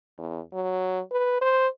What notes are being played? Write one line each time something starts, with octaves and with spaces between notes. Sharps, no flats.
E2
F#3
B4
C5